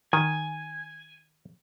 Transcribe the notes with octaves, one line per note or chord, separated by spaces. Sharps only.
D#3 G#5